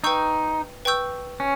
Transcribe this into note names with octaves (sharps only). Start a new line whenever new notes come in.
D#4 B4 G5 C#6 E6 G6
B4 G5 C#6 E6 G6
C#4